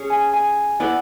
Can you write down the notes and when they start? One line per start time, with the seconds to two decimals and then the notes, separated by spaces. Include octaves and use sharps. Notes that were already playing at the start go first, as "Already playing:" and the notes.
Already playing: C#4 G#4 C#5
0.10 G#5
0.33 G#5
0.80 B3 E4 B4 D5